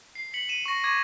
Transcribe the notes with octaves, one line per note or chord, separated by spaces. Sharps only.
C7
B6 C#7 F#7
D#7 E7
C#6 A#6
C#6 D6 G#6 A#6